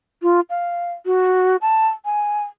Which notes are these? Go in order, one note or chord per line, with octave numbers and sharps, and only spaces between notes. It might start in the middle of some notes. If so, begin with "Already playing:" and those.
F4
F5
F#4
A5
G#5